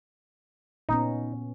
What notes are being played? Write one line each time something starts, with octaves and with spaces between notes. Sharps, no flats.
A#2 B3 C#4 D#4